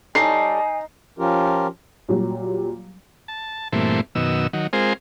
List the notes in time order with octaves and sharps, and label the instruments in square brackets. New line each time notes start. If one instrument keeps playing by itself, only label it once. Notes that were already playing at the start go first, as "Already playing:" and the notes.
[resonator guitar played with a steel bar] G3 A4 C#5 [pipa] D#4 [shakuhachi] G#5 [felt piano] C7
[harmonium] F3 C#4 F4 G4 A#4
[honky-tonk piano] A#2 F#3 G3
[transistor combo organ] A5
G2 A#2 E3 A3 C4
F#2 B2 D#3 E6
D#3 F#3
G#3 C4 F4 G#4 A#4 C5